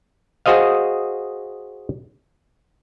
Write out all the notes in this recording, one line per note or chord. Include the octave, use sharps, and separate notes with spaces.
F#4 G#4 C5 D#5 F5